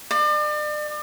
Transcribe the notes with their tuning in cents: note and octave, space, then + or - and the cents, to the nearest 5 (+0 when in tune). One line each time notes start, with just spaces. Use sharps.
D5 +40